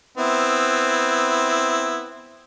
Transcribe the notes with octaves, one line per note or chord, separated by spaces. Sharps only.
B3 C4 E4